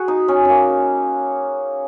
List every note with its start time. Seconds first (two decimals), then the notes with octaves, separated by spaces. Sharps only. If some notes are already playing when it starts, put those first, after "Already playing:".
Already playing: F#4 G#4
0.08 D#4
0.28 C#4
0.45 A#3 C#4